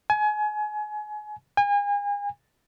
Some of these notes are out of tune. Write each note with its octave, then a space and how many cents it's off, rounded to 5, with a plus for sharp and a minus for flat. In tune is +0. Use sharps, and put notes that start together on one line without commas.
G#5 +30
G#5 -35